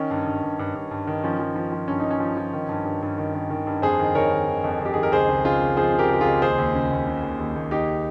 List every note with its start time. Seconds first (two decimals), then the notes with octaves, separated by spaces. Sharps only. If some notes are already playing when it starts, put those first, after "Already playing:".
Already playing: D#3 C#4
0.11 G2
0.26 G2
0.43 G2
0.59 G2
0.75 G2
0.91 G2
1.07 D#3
1.23 F3 C#4
1.39 F3
1.56 F3
1.72 F3
1.88 G2 C#4
2.00 D#4
2.05 G2
2.11 C#4
2.20 F3
2.37 F3
2.53 D#3
2.69 G2
2.85 G2
3.02 G2
3.18 D#3
3.35 D#3
3.50 D#3
3.67 G2
3.82 F2 G#4 C5
3.99 D#3
4.15 D#3 A#4 C#5
4.32 D#3
4.48 D#3
4.64 F2
4.81 F2 G4
4.94 D#3 G#4
5.03 A#4
5.12 C#2 G#4 C5
5.28 C#2
5.44 C#3 F4 G#4
5.62 C#2
5.77 F3 G#4 C5
5.94 C#3
5.99 G4 A#4
6.09 C#2 G4
6.20 C#2 F4 G#4
6.42 D#2 G#4 C5
6.58 D#2
6.75 C#3
6.91 D#2
7.07 C#3
7.23 D#2
7.40 D#2
7.56 D#2
7.71 D#2 D#4 G4